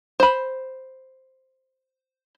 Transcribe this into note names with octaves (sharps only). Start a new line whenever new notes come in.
C5 B5